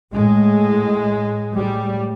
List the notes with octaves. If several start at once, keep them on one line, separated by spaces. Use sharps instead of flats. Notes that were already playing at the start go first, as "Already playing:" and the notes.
A2 G#3
A2 G3